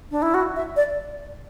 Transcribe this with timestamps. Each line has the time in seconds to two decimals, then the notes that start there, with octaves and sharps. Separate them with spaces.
0.11 D4
0.22 E4
0.34 F#4
0.56 E5
0.76 D5